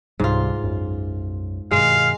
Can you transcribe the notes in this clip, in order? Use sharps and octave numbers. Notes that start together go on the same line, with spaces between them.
C#2 G#2 C3 G3 F4
B1 F#2
G2 B2 D#3 G#3 F5